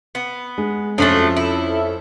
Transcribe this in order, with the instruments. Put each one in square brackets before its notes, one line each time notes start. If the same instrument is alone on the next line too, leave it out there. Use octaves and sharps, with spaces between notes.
[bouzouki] B3
[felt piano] G#3
[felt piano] F2 C#4 [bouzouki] F3 F#3 A3 [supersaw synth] A4 E5
[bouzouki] E4